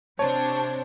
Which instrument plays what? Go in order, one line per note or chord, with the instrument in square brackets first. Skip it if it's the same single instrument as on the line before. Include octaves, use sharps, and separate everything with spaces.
[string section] C3 D4 [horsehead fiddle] C5 [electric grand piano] C#5 [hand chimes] A5